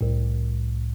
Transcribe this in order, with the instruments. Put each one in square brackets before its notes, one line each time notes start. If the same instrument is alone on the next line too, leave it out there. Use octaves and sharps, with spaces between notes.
[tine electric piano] C2 A2